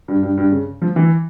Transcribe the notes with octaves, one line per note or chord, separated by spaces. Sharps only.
G2
G2
G2
C#3
F3
E3